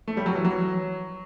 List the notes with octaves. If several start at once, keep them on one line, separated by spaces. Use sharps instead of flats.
A3
G3
F#3
E3
F#3